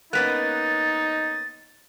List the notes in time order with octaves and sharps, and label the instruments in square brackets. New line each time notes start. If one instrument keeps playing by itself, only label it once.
[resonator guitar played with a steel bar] A#3 B3 C#4 [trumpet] D#4 [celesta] F#6 B6 [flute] A6